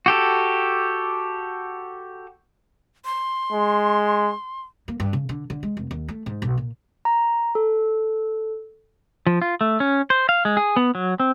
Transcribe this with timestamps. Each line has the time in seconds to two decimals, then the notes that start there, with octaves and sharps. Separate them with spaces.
0.06 F#4 G4 A4
3.05 C6
3.52 G#3
4.88 A#3
5.00 G2
5.13 C#3
5.29 D3
5.50 D3
5.63 G#3
5.77 F1
5.91 D#2
6.08 A3
6.26 G#2
6.42 B1
6.57 A#2
7.05 A#5
7.55 A4
9.27 F3
9.42 F4
9.61 A3
9.80 C#4
10.10 C5
10.29 F5
10.45 G#3
10.57 G#4
10.76 B3
10.95 F#3
11.20 C4